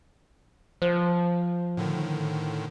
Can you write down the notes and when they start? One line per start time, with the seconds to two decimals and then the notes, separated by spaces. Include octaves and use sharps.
0.82 F3 C5
1.77 A2 D3 D#3